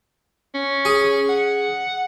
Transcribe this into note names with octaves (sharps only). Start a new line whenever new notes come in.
C#4
G#4
F#5